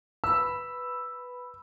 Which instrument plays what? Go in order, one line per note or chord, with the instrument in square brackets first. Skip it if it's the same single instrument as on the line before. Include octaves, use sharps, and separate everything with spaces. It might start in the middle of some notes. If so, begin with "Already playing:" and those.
[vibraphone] B4 B5 [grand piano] E6